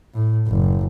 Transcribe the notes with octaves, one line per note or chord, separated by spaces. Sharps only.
A2
F#1